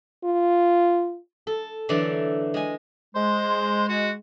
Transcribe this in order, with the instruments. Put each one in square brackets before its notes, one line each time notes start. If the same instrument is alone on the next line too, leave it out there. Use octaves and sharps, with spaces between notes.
[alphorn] F4
[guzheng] A4
D3 E3 F#3 A3 D5
G#3 G#5
[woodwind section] G#3 [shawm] C5
[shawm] F#4